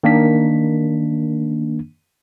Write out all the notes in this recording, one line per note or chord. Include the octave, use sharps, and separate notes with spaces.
D#3 A#3 D4 B6